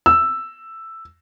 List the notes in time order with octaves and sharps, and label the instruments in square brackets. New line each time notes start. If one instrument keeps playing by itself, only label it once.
[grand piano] E6